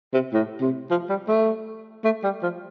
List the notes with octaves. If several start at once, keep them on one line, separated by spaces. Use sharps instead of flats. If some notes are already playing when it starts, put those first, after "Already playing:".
C3
A2
C3
F3
G3
A3
A3
G3
F3